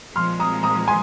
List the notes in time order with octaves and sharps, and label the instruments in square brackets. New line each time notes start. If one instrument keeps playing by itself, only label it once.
[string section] A#2 F3 G#3 [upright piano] C6 F6
[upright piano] A#5 D#6
A#5 D#6
G#5 C6